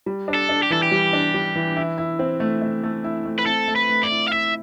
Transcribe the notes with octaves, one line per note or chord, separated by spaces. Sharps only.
G3
D4
A4
D4
G4
E3 A4
G4
G3
D4
G3
E3
E4
E4
C4
A3
A3
A3
E4
A3
B4
C4 A4
A3
B4
A3
D5
E4
F5
E4 E5